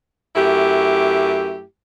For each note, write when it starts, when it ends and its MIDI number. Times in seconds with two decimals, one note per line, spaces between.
0.36 1.62 42
0.36 1.62 57
0.36 1.62 64
0.36 1.62 67